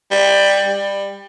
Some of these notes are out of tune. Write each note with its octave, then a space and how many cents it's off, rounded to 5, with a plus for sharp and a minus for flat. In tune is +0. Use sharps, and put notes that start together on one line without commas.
G3 +15
G3 +20